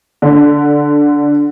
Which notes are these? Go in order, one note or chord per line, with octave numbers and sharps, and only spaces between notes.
D3